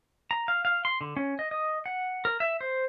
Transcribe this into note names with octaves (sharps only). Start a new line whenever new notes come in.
A#5
F5
F5
C6
D3
C#4
D#5
D#5
F#5
A#4
E5
C5